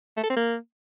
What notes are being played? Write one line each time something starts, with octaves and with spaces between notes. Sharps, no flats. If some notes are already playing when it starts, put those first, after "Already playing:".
A3
A4
C4
A#3